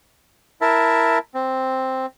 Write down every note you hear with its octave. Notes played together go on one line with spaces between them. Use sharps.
E4 A#4 E5 A5
C4